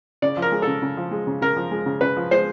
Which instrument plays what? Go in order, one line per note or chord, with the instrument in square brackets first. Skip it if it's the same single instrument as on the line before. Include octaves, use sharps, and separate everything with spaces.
[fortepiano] C#3 D5
F3
A#4
G#3
C#3 A4
C#3
F3
G#3
C#3
C#3 A#4
F3
G#3
C#3
C#3 B4
F3
G#3 C5